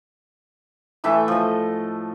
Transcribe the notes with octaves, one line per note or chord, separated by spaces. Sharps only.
A2 E3 A3 E5
F3 D#5